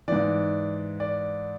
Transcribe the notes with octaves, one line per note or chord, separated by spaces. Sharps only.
G#2 E3 D5
D5